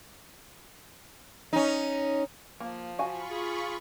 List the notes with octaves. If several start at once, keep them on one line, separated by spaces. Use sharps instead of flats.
C#4 D#4
F3 A#3
F4 F#4 F5 G#5 B5 C#6
G#4